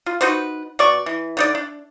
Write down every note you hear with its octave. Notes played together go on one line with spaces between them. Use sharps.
F4
D#4 F#4 B4 C5
B2 D5 C#6
E3
D3 D#4 D5
D4